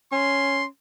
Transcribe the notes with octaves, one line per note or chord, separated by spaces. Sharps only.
C#4 C6